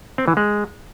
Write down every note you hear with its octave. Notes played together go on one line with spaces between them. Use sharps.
C4
E3
G#3